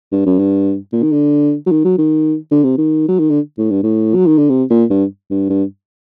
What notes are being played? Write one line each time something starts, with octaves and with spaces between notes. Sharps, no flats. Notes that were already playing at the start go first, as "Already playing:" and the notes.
G2
F#2
G2
A#2
D#3
D3
F#3
D#3
F#3
D#3
D3
C3
D#3
F#3
D#3
D3
A2
G2
A2
F#3
D#3
D3
C3
A#2
G2
G2
G2